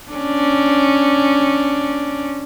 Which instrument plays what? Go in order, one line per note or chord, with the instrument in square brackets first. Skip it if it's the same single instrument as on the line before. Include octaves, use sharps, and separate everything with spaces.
[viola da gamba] C#4 D4